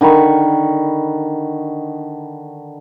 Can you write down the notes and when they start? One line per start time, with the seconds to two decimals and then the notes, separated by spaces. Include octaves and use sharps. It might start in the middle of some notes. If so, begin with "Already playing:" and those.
0.01 D3 D#3 B5 C#6